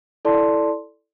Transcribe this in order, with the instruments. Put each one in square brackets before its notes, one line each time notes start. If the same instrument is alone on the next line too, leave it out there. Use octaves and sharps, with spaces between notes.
[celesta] E4 A4 D5 A5 C6